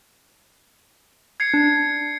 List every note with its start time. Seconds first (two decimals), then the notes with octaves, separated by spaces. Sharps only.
1.40 G#6 C7 C#7
1.54 D4